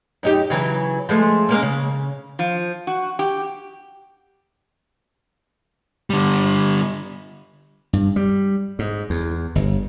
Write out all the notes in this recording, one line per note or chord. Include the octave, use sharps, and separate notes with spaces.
F#2 D#4 G4
C#3 E3 F#3
F3 G#3 A3
G#3 A#3 C#4
C#3
F3
F#4
G4
D3 G3
G2
G3
G#2
E2
G1